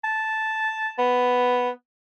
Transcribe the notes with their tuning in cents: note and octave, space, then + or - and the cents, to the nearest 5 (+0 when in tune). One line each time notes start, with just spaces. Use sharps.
A5 -5
B3 +5